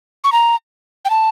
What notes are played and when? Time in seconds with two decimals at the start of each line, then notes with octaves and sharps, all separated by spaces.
0.24 C#6
0.32 A#5
1.05 G5
1.10 A5